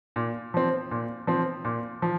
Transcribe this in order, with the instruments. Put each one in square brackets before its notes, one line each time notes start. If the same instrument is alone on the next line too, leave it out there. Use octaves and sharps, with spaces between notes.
[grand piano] A#2
F3 C4
A#2
F3 C4
A#2
F3